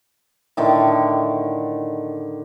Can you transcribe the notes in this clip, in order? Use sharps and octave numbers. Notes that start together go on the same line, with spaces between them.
A2 D3 D#3